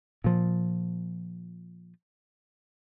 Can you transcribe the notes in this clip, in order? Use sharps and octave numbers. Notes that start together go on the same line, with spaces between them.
A#2 F3